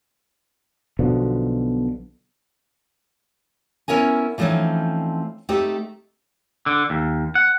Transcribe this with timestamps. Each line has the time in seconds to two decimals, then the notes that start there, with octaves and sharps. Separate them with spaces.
0.99 B1 B2 D3 F3
3.88 B3 C#4 E4 A#4 G#5
4.38 E3 F3 A3 C4 C#4 D#4
5.49 A3 C4 D#4 G4
6.66 D3
6.90 D#2
7.35 F#5